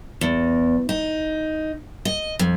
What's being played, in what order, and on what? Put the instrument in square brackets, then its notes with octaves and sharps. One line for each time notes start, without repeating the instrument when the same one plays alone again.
[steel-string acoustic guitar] E2
D#4
D#5
F2